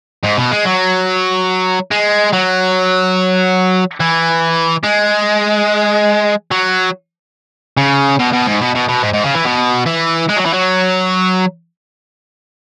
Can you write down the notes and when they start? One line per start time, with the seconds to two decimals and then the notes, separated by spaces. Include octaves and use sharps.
0.23 G#2
0.37 B2
0.51 G#3
0.65 F#3
1.91 G#3
2.33 F#3
4.00 E3
4.84 G#3
6.51 F#3
7.77 C#3
8.19 B2
8.33 B2
8.46 G#2
8.61 B2
8.75 B2
8.88 B2
9.03 G#2
9.13 G#2
9.24 C#3
9.34 E3
9.45 B2
9.86 E3
10.29 G#3
10.37 F#3
10.45 E3
10.53 F#3